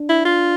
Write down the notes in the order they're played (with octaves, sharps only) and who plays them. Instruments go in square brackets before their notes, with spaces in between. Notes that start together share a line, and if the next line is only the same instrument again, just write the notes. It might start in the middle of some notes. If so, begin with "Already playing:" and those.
Already playing: [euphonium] D4
[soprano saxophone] E4
F4